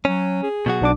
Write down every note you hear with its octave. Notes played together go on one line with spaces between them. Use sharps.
F#3 C#4
G#4
B2 F#3 F#4
B1 D4 D6